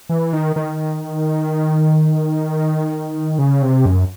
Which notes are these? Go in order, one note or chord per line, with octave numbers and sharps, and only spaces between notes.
E3
D#3
D#3
C#3
C3
F#2